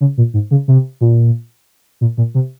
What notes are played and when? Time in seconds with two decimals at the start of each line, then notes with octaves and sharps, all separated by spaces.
0.01 C#3
0.18 A#2
0.34 G#2
0.51 C#3
0.68 C3
1.01 A#2
2.01 A#2
2.18 A#2
2.35 C3